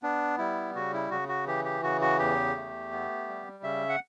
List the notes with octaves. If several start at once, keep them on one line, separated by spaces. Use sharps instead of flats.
B3 D4
G3 E4
C#3 F#4
E4
C#3 F#4
F#4
E3 G4
G4
C#3 F#4
F#4
E2 G4
A3
B3
G3
C#3 E5
F#5